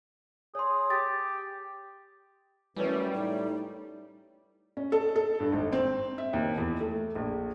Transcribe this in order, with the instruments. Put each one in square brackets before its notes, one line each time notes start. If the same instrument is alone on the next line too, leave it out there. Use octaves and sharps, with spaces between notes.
[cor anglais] G#4 [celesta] C#5 C6
[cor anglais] G4 [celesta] A6
[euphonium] F#2 [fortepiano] E3 A3 C#4 [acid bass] G3 [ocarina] B4
[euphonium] A2 [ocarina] D#4
[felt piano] C#4
A4
A4
G2
G#1
C4
E5
D#2
E2
A3
A#1